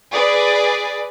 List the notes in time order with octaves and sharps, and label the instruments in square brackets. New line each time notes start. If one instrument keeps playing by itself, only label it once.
[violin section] G#4 B4 D5